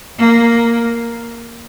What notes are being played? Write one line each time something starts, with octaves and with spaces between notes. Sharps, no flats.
A#3